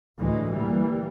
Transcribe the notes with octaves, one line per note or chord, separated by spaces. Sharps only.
D2 A2 E3 G#3
E3 G3 A#3